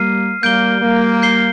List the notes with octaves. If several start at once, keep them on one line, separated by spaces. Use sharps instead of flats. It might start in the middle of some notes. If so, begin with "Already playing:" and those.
Already playing: G3 A#3 F6 C7 D#7
G3 A#3 G6 D7 G7
G3 A#3
G6 C7 G7